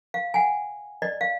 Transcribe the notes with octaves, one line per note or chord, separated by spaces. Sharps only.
F5
F#5 G#5
D5 D#5
F5